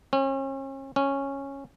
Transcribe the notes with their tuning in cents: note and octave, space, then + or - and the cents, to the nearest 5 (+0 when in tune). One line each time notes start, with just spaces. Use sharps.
C#4 -40
C#4 -10